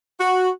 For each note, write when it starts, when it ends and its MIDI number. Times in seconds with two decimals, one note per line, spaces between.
0.20 0.49 66